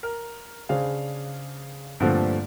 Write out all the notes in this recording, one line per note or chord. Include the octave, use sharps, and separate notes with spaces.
A#4
C#3 D4 G#4 C5 F5
G2 A#2 D3 F3 A3 C4